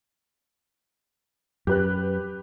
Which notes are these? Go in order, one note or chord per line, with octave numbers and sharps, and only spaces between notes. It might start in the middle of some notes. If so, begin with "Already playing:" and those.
F#2 G4 B4 F#6